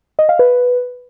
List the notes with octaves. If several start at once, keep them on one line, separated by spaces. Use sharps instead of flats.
D#5
F5
B4